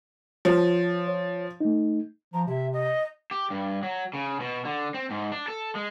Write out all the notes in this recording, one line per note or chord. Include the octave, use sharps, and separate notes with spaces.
F3 C#5 A5
C#5
A3 D#4
F3 A#5
C3 E5
D#5
G4
G2
F#3
C#3
B2
D3
C4
G#2
D4
A4
G#3